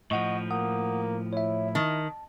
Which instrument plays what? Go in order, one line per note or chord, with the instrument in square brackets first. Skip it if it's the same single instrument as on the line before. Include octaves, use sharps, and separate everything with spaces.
[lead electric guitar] A2 F3 [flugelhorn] D#5 [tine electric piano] F#5 C#6
[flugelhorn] A#3 [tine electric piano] F#5 D#6
[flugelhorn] E4 [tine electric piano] C#5 E5
[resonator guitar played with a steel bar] D#3 [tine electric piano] A5